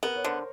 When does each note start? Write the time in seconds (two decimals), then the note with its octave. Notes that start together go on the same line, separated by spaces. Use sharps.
0.03 B3 A#4
0.16 C#5
0.24 D3 C5